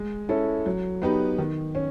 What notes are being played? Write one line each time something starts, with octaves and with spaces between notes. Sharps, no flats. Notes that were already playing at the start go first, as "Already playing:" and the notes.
Already playing: G#3
C#4 E4 A4
F#3
B3 D#4 G4 B4
D#3
C#4